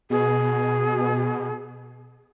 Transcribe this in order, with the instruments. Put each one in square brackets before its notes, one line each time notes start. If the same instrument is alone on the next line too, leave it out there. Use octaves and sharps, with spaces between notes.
[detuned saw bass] B2 [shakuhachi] G#4